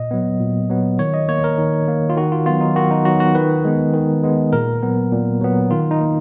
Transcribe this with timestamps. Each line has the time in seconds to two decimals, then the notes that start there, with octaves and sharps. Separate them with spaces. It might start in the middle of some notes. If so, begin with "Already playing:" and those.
Already playing: A#2 D#5
0.11 F#3 B3
0.41 A#2
0.70 F#3 B3
0.99 D#3 C#5
1.14 D#5
1.29 A#3 C#5
1.44 A#4
1.58 D#3
1.88 A#3
2.10 F4
2.17 D#3 F#4
2.32 F4
2.46 F#3 B3 F4
2.61 D#4
2.76 D#3 F#4
2.91 D#4
3.05 F#3 B3 F#4
3.20 F#4
3.35 D#3 B4
3.65 G#3 B3
3.94 D#3
4.24 G#3 B3
4.53 A#2 A#4
4.82 F#3 B3
5.12 A#2
5.41 F#3 B3
5.71 D#3 F4
5.91 D#4
6.01 A#3